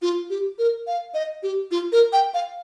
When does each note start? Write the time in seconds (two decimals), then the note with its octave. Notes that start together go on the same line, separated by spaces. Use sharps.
0.02 F4
0.30 G4
0.59 A#4
0.87 F5
1.14 D#5
1.43 G4
1.71 F4
1.92 A#4
2.13 G5
2.34 F5